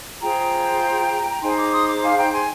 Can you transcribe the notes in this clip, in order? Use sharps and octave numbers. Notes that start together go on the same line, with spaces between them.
F4 G#4 C5 G5 A#5
A#5
D#4 G#4 C5 G#5 C6
A#5 D6
C6 D#6
A#5 D6
F5 G#5
G5 A#5
G#5 C6